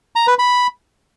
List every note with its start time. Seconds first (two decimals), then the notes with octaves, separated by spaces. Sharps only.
0.16 A#5
0.27 B4
0.39 B5